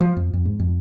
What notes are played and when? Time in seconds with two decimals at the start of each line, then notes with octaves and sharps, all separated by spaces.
0.01 F3
0.17 F2
0.33 F2
0.45 G#2
0.60 F2